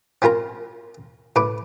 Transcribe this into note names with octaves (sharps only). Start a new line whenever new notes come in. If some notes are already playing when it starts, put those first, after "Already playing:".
C4 C#4 F4 A#4 A#5
A2 B4 D6